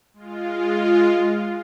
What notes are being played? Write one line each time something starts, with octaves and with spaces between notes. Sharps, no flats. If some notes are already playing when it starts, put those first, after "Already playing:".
G#3 F4